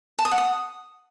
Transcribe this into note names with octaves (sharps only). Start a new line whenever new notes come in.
A5
D#6
F#5
D#6